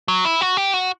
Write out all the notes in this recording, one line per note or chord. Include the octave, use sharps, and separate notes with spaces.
F#3
E4
F#4
G4
F#4